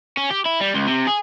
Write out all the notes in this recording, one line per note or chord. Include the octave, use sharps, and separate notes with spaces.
C#4
G4
E4
G3
C#2
C3
G#4